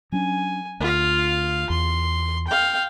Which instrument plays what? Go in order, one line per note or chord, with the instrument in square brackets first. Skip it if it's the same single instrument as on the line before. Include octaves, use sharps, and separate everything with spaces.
[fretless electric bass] F#3 C#4 D4 [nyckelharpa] G#5
[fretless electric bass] D2 [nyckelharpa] F4 F5
[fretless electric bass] E2 [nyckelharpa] C6
[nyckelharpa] F5 G5